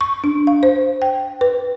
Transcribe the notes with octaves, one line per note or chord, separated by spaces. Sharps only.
C#6
D4
F5
C5
G5
B4